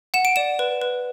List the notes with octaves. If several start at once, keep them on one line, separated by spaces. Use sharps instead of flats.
F#5 E7
D7
D5 E7
B4
B4